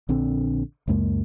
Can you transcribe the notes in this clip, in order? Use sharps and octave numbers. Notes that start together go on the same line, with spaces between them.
A#1 D3 C4
C#2 F#2 G#3 A#3